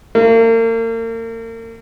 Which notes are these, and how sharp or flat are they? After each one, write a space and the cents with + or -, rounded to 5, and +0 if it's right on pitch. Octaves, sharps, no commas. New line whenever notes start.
A#3 -40